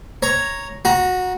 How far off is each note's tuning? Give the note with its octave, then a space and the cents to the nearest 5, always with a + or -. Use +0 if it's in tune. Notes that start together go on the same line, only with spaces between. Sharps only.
C#5 +0 A#5 +0
F#4 -15 A#5 +20